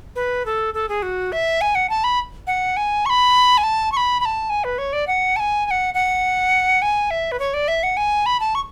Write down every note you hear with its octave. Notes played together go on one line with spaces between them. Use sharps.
B4
A4
A4
G#4
F#4
E5
G#5
F#5
A5
B5
F#5
G#5
C#6
B5
G#5
A5
C#6
B5
B5
A5
G#5
B4
C#5
D5
F#5
A5
G#5
G#5
F#5
F#5
G#5
E5
B4
C#5
D5
E5
F#5
G#5
B5
A5
C#6